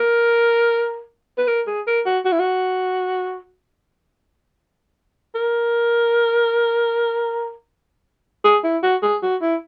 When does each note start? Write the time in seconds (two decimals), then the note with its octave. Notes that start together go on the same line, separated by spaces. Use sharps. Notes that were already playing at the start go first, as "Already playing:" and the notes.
Already playing: A#4
1.38 B4
1.48 A#4
1.67 G#4
1.87 A#4
2.06 F#4
2.25 F#4
2.32 E4
2.40 F#4
5.35 A#4
8.44 G#4
8.64 E4
8.83 F#4
9.03 G#4
9.23 F#4
9.42 E4